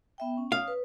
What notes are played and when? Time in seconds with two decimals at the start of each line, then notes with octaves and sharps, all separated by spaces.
0.18 B3 E5 G5
0.37 C#4
0.52 C#5 F5 D#6
0.68 B4